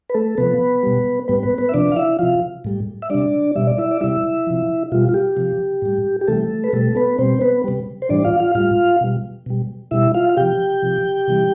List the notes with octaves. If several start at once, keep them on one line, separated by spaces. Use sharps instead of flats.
B4
A3 A4
C3 F3 B3 B4
B2 G3
A2 G3 B3 B4
B3 B4
B3 B4
E5
C3 F3 D4 D5
F5
E4 E5
C3 F3 F4 F5
A2 G3
E5
C3 G3 D4 D5
B2 G3 E5
D5
E4 E5
D5
C3 G3 E4 E5
C3 F3
B2 G3 F4
F4
G4
C3 F3
A2 G3
G4
C3 E3 G3 A3 A4
B4
B2 G3 A3 A4
B3 B4
B2 G3 C4 C5
B3 B4
C3 G3
C5
A2 E3 G3 D4 D5
F4 F5
F4 F5
A2 G3 F4 F5
B2 G3
B2 G3
B2 G3 E4 E5
F4 F5
F5
C3 F3 G4 G5
C3 F3
C3 E3 G3